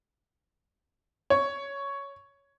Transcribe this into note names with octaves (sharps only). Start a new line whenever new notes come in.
C#5